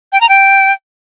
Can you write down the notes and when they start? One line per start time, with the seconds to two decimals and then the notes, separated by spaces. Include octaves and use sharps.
0.12 G5
0.21 A#5
0.29 G5